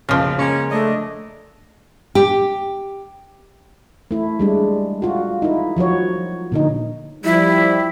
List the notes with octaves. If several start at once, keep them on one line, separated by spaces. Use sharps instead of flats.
F#1 B1 C#3 F3 F6
G#3 A#3 C#4 A#4
A3 D4 D#5
G4
A3 E4
G3 G#3 D4
F4 F#4
D#4 E4
F3 F#3 F#4 C#5
A#2 D3 D#4
F3 G3 E4